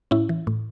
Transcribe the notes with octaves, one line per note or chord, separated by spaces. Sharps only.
A2 C#4 E4
E3
A2